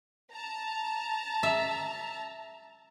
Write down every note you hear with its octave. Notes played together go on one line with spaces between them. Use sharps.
A5 A#5
E5